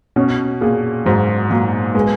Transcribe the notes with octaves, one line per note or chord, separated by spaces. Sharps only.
B2 C#4
A#2 G#4
G#2 F#3
A#2 F#3
G#3 B3